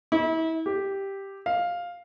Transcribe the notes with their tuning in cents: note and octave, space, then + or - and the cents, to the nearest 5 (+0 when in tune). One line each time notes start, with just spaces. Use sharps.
E4 -35
G4 +0
F5 +5